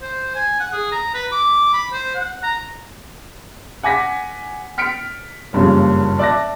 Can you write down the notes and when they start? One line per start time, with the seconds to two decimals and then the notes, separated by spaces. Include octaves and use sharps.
0.02 C5
0.35 G#5
0.60 F#5
0.73 G#4
0.92 A#5
1.14 B4
1.32 D6
1.73 B5
1.92 C5
2.15 F#5
2.43 A#5
3.83 F#5 G#5 D6 A#6 B6
4.78 F6 B6 C#7 D7
5.53 F#1 G2 A#2 C#3 F3
6.19 D5 E5 A5 D6 F#6 A#6